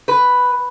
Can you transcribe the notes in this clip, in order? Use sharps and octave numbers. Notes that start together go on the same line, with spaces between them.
B4